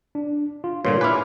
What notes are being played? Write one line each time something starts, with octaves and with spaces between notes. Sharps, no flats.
D4
F4
G2 A#2 D3 C#5 C6
E4 B4 G#5 D6 F6